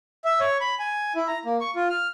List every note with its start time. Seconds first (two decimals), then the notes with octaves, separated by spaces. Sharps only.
0.25 E5
0.40 C#5
0.61 B5
0.79 G#5
1.16 E4
1.28 A#5
1.45 A#3
1.61 C#6
1.76 F4
1.90 F6